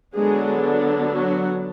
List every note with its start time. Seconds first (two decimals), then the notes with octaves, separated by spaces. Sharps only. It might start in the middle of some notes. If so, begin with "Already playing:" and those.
0.15 D3 F#3 G#3 B3 D4 G#4
1.12 F#3 F#4